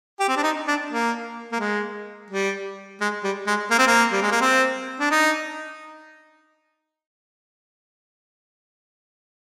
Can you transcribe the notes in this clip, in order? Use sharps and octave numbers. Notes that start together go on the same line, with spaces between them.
G4
C4
D4
D#4
D4
A#3
A#3
G#3
G3
G#3
G3
G#3
A#3
C4
A#3
G3
G#3
A#3
C4
D4
D#4